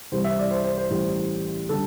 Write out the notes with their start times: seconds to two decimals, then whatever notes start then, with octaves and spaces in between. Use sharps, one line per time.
0.12 C2 C3 E3 G3 C5
0.24 E5
0.38 D5
0.51 C5
0.64 C5
0.78 C5
0.90 A1 A2 G3
1.69 D3 G3 A4